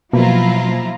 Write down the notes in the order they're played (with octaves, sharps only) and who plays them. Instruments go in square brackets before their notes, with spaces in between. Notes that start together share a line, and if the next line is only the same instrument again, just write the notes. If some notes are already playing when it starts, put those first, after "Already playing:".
[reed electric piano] B2 [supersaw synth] F3 A#5 [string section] F#3 E4 F4 [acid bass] A#3